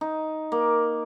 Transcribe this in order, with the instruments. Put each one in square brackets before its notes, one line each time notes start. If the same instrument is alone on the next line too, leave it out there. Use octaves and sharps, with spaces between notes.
[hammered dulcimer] D#4
A#3